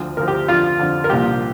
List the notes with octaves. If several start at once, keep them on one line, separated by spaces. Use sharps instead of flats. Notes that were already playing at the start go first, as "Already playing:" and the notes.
Already playing: D2 D3 F3
D2 D3 F3 A#4
G4
F2 D3 F3 F4
F2 D3 F3
A#4
C2 A#2 F3 G4